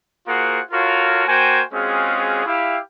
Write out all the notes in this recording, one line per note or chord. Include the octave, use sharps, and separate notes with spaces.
A#3 F4 F#4 G#4 C5 F#5
F4 F#4 A4 A#4 C#5 F5
A#3 F#4 C5 G5 G#5
G#3 C4 C#4 F4 F#4 G#4
E4 G4 F5